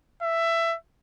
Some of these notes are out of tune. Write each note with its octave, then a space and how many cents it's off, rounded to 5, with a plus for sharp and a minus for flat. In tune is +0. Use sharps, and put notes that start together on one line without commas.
E5 +15